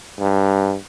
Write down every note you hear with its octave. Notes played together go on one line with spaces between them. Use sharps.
G2